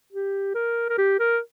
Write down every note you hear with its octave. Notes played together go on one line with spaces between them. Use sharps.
G4
A#4
A#4
G4
A#4